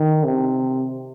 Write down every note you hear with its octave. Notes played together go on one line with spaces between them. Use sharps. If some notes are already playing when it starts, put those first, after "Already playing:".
Already playing: D#3
C3